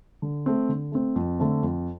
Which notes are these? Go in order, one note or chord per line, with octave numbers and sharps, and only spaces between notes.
D3
A3 C4
D3
A3 C4
F2
D3 A3 C4
F2